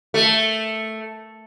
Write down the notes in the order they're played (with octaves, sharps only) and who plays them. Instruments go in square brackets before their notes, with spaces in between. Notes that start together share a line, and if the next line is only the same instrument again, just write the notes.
[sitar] A3